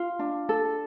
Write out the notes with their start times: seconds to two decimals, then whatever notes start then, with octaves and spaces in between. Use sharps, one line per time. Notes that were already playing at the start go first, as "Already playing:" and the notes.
Already playing: F4
0.19 D4
0.49 A4